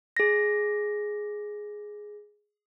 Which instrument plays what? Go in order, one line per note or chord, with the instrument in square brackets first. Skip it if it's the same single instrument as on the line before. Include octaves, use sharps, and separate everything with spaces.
[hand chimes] G#4 A#6